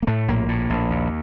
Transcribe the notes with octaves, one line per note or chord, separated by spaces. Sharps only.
A#3
A2 A3
A#1 A#3
A2
A#1
D#2